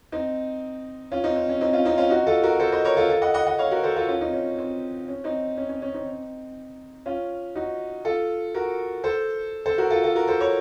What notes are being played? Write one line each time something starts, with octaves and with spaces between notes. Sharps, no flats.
C4 D#4
C#4 F4
C4 D#4
C4
C#4
C4 D#4
C#4 F4
C4 D#4
C#4 F4
D#4 F#4
F4 A4
F#4 A#4
A4 C5
C5 D#5
A#4 C#5
F4 A4
F4 A4
D#5 F#5
D#5 F#5
D#5 F#5
C#5 F5
F#4 A#4
A4 C5
F4 A4
C#4 F4
C4 D#4
C#4
C4
C#4
C4 D#4
C#4
C#4
C#4
C4 D#4
C#4 F4
D#4 F#4
F4 A4
F#4 A#4
A4 C5
A4 C5
F#4 A#4
F4 A4
F4 A4
F#4 A#4
A4 C5
A#4 C#5